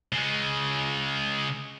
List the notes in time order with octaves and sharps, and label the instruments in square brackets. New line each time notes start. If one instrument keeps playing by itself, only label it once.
[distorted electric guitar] C#3 G#3